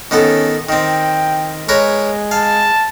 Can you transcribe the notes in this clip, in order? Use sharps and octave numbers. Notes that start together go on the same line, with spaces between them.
D#3 B3 C#4 A4
D#3 C4 G5
G#3 A#4 B4 C#5
F5 A5